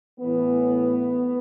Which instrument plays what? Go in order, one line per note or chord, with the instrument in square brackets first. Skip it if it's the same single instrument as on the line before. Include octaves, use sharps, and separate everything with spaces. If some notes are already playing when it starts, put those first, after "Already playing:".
[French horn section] A2 E3 B3